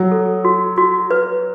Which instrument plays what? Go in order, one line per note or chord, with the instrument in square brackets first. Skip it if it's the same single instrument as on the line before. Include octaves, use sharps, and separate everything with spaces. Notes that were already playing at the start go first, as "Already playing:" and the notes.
Already playing: [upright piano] F#3 [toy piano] C#5
[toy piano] A4
F#4
F#4
B4